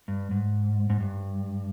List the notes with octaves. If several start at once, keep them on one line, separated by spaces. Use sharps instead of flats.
G2
G#2
G#2
G2